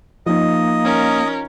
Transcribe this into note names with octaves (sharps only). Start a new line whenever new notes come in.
F3 A#3 D#4 D#5
C#4 A#4